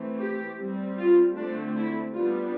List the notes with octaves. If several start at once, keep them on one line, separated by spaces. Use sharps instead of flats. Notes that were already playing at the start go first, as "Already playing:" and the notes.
Already playing: E3 A3 C4
G4
G3 C4
F4
D3 A3 C4 D4
E4
G3 B3 D4 F4